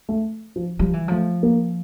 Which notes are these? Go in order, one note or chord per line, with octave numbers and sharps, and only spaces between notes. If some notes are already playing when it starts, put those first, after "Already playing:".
A3
F3
F3 G3
E3
F3 A3
A#3